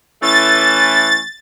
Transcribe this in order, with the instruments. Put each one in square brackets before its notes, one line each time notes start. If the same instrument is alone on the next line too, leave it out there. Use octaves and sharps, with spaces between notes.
[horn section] E3 A3 C#4 [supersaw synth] A6